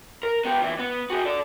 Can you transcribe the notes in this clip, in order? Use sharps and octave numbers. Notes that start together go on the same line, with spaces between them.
A#4
B3 G4
D2 E3
B3
F#4 G#4
A4 D5